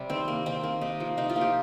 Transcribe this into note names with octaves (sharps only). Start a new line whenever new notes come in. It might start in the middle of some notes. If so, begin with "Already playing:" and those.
Already playing: C3 G3
D#3 C4
A#3
D#3 C4
A#3
C3 D#4
F3 A#3
C3 D#4
F4
F3 A#3
G4